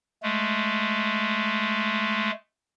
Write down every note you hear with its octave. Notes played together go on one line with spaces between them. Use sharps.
G#3 A3